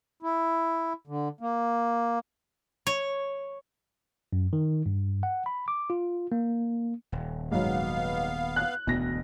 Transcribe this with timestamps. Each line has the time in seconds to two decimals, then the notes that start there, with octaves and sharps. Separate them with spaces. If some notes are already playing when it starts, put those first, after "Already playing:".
0.23 E4
1.07 D3
1.41 A#3
2.87 C#5
4.33 F#2
4.53 D#3
4.86 G2
5.23 F#5
5.46 B5
5.68 D6
5.90 F4
6.32 A#3
7.12 D#1
7.52 G#2 F#3 B3 F5
8.56 F#6
8.87 E1 D2 B2 A#6